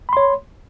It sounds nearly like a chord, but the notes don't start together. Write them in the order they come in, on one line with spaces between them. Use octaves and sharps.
B5 C6 C#5